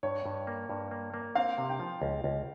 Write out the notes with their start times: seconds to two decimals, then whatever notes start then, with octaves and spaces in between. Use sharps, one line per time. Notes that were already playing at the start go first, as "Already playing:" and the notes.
0.03 G2 C#5
0.26 G2
0.47 A#3
0.70 G2
0.91 A#3
1.14 A#3
1.35 C4 F5
1.58 C3
1.69 G5
1.80 F3
2.02 C#2
2.24 C#2